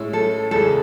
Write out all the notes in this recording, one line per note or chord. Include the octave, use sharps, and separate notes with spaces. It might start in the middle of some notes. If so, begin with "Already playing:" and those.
Already playing: A2 G#3 C#4 E4
A4
E2 C#3 G#3 A4